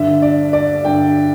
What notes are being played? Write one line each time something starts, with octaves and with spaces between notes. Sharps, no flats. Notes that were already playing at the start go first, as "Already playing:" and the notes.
Already playing: G2 D3 E5
D5
D5
G2 D3 G5